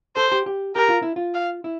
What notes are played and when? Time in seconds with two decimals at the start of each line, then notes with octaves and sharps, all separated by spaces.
0.16 A4 C5
0.32 G4
0.46 G4
0.76 G4 A#4
0.89 F4
1.02 E4
1.16 F4
1.34 F5
1.64 E4